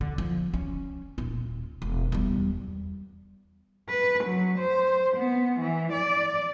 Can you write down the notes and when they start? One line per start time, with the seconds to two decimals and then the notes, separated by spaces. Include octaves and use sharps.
0.01 D3
0.18 F3
0.54 C#4
1.18 D#1 F4
1.82 E1
2.12 E2 G3
3.88 B4
4.24 F#3
4.58 C5
5.17 B3
5.60 E3
5.92 D5